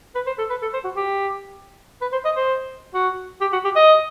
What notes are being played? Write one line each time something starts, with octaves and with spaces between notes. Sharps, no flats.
B4
C5
A4
B4
A4
C5
F#4
G4
B4
C5
D#5
C5
F#4
G4
F#4
G4
D#5